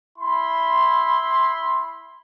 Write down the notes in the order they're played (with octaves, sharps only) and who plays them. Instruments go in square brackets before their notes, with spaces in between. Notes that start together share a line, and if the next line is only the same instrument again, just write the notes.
[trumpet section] E4 B5 C6